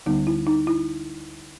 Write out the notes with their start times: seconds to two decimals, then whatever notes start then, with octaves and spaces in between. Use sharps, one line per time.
0.06 D2 D3 G3 B3 D#4
0.27 E4
0.47 D#4
0.67 E4